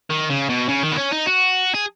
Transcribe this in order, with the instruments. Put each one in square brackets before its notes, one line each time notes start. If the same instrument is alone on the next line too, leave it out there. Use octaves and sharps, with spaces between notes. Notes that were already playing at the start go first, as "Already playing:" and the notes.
[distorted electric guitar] D#3
C#3
B2
C#3
D#3
B3
C#4
D#4
F#4
G#4